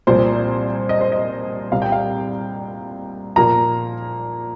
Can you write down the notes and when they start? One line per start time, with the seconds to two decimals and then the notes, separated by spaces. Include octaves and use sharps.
0.07 C2 A#2 F3 C5
0.89 D#5
1.01 C5
1.12 D#5
1.72 C2 A#2 G3 A#3 F5
1.82 G5
1.92 F5
3.36 A#2 F3 A#3 A#5